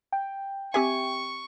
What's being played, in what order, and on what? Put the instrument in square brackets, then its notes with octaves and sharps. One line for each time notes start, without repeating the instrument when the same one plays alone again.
[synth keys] G5
[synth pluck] C4 G4 E5 [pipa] G#5 [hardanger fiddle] C#6